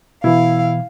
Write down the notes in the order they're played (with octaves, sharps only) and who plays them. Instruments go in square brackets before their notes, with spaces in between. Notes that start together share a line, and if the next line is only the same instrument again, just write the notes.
[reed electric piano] B2 E3 [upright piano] E4 [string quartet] F5